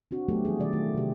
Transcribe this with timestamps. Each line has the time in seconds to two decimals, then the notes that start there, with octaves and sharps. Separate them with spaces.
0.11 C4 D4 F#4
0.28 F#3 A3 B3 G4 A4
0.45 E3 G3 D4 G#4
0.59 B2 D#3 F#3 D5
0.73 A3 F4
0.94 C3 G4